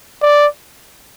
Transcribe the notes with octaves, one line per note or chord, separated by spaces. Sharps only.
D5